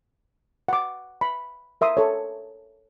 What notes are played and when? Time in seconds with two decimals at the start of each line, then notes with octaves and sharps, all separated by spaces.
0.68 F#5 D6
1.21 B5
1.81 A#4 E5 C6 D#6
1.97 A4 C#5